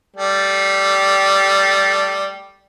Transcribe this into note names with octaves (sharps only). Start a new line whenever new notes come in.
G3 A3